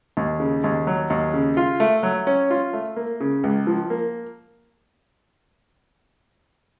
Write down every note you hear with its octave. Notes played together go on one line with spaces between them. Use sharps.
D#2
C#3
D#2
F#3
D#2
C#3
F4
A3
F#3
C#4
F4
A3
A#3
C#3
C#2
F3
A#3